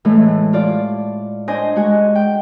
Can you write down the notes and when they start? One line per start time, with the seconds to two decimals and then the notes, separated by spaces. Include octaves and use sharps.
0.05 A2 E3 G#3 A3
0.53 F4 D5
1.48 D4 C5 D#5 G#5 C6
1.76 G#3 F#4 G#5
2.15 G5